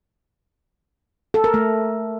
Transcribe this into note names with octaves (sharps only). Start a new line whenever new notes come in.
A4
A#4
A3